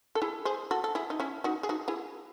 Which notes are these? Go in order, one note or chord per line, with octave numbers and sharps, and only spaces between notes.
A4
E4 G#4
G#4 C5
F#4 A4
A4
E4 G#4
D#4
C#4 E4
D#4 F#4
G#4
D#4 F#4
E4 G#4